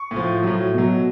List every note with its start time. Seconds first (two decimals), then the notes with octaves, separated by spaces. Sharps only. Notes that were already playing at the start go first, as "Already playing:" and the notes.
Already playing: C#6
0.11 A2
0.16 F3
0.43 A2 F#3
0.74 B2 F#3